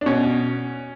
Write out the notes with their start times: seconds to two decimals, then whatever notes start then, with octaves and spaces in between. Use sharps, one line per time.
0.01 D4
0.06 B2 C#4